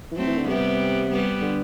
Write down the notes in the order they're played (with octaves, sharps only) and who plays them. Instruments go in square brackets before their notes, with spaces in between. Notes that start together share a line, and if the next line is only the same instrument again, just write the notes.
[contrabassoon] E3
[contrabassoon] F#3 [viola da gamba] A3 C4
[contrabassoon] E3
D3
[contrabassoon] C3 [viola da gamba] G3 B3
[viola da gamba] G3 B3
[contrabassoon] D3